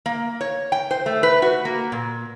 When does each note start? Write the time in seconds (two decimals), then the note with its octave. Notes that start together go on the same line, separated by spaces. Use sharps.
0.06 A#3
0.41 C#5
0.72 G5
0.91 C5
1.06 A3
1.23 B4
1.42 F#4
1.65 A#3
1.92 A#2